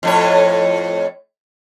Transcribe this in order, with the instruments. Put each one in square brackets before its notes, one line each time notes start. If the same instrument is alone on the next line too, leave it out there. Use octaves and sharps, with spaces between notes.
[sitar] F2 A2 C#5